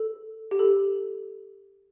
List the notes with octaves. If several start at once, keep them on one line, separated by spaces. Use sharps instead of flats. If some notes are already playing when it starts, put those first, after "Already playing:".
Already playing: A4
G4
A4